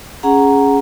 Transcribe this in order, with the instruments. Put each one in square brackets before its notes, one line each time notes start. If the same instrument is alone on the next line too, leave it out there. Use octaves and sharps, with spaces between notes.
[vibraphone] C#4 G#4 F#5 A#5